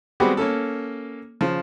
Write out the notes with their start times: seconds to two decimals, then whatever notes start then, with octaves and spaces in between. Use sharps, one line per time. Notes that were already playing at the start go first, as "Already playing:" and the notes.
0.20 G3 G#3 B3 C4 F#4 G4
0.37 A#3 C#4 A4
1.41 C#3 F3